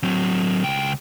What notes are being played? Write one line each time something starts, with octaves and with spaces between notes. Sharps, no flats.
F#3 C4
C#2 G5